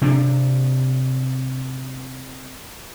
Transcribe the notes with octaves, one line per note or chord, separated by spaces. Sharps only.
C3 D4